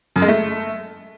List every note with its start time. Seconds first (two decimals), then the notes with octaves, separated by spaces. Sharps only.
0.16 F#2
0.22 G#3
0.28 A3